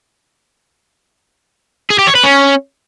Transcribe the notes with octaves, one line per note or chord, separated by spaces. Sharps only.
G#4
G4
C#5
B4
C#4